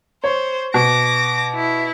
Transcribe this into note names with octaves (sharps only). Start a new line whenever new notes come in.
C5 C#5
B2 D6 A#6
E4